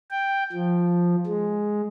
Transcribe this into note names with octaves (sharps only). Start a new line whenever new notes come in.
G5
F3
G#3